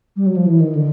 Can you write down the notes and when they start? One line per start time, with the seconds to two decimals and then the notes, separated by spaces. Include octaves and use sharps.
0.16 G3
0.26 F#3
0.36 F3
0.46 E3
0.60 D#3
0.75 D3